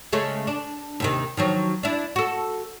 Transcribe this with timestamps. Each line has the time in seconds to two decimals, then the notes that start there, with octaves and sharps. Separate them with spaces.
0.12 C#3 G#3 A3
0.47 D4
1.00 D#2 C3 D#3
1.37 D#3 F3 F#3
1.83 D4 E4
2.16 F#4 A4